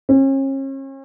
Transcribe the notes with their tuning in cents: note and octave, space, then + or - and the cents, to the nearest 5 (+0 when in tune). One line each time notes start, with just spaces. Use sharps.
C#4 -40